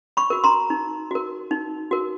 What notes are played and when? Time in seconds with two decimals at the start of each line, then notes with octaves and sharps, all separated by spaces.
0.17 B5 C#6
0.30 F#4 A#4
0.44 A#5 C6
0.70 D#4
1.11 F#4 A#4
1.51 D#4
1.91 F#4 A#4